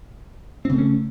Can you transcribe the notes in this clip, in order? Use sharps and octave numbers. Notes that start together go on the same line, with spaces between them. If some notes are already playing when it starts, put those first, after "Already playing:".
C#3 A3 C4 C#4